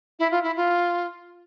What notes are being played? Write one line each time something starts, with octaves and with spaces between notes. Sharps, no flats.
E4
F4
E4
F4